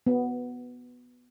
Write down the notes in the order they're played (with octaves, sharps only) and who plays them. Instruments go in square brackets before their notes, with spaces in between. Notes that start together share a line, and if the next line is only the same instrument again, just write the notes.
[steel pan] B3